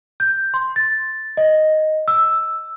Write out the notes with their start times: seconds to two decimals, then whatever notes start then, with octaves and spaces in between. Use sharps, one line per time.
0.20 G6
0.54 C6
0.76 A6
1.37 D#5
2.08 E6